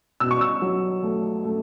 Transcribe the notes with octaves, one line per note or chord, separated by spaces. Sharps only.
B2 E6
C#6
E6
F#3
A3
A3